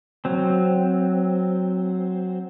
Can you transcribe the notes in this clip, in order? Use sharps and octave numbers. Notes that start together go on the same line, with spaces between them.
F#3 C4